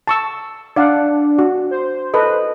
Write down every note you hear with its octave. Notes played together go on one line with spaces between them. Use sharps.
A5 C#6 E6
D4 D5 F5 F#5
F#4
C5
A4 B4 D#5